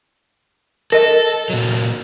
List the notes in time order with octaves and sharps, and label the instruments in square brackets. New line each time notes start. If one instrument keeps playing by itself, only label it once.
[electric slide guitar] A4 [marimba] A#4 D#5
[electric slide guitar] A#2 F#3